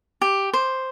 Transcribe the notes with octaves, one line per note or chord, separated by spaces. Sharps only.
G4
C5